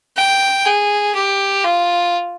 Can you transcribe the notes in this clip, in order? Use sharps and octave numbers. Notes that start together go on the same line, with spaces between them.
G5
G#4
G4
F4